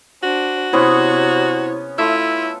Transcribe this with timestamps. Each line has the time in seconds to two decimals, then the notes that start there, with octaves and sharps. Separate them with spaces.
0.23 D4 F#4 C5
0.73 C3 B3 C#4 E4 C5 C#5 C6 G#6
1.98 A3 E4 F4 E6